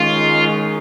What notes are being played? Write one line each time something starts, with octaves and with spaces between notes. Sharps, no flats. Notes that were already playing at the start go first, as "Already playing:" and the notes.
Already playing: D#3 G#3 C#4 F4